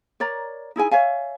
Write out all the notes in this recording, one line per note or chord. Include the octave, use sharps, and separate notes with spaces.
A#4 C#5 D5 A#5
D#4 E4 G#4 G#5
C#5 E5 F5 G#5